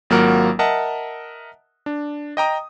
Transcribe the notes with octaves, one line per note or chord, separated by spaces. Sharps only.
G#1 F#3 A#3 F4 A#4 F#5
A#4 D#5 E5 F#5 A5
D4
D#5 G5 A#5 D#6